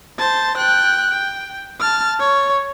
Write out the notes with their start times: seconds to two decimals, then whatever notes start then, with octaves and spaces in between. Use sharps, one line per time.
0.19 C5 A5
0.57 G5 F#6
1.10 G5
1.80 A5 F6
2.20 C#5